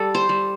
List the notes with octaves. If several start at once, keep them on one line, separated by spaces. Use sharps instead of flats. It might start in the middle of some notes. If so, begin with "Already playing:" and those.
Already playing: G3 A4
C5
G3